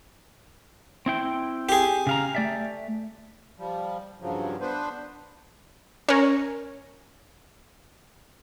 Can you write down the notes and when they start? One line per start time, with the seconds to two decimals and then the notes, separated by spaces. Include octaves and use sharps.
1.06 C4 E4 G5
1.69 G4 G#4
2.07 C#3 F5 A#5
2.35 A3 D5 E5
3.58 F3 G3
4.21 G2 C#3 F3 F#3
4.61 B3 D4 B4 C5
6.09 C#4 A#4